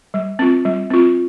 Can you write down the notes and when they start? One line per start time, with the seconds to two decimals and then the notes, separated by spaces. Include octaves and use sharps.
0.14 G3
0.39 C4 F4
0.65 G3
0.90 C4 F4